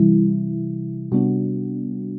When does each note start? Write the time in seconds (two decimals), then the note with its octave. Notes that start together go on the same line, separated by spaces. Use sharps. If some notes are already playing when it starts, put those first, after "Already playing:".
Already playing: C3 E3 G3 E4
1.12 C3 G3 B3 D4 F#4